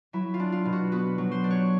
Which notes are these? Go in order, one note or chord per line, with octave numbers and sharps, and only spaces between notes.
F#3 E4
F4
D4
F4
B2
F#4
B3 F#4
F#3
C5
D4
C#5